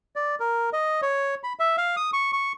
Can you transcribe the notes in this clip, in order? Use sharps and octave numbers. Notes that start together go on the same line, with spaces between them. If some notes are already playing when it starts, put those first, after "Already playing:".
D5
A#4
D#5
C#5
B5
E5
F5
D#6
C#6
C#6